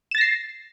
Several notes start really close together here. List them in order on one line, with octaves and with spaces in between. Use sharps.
E7 A6 A#6 C7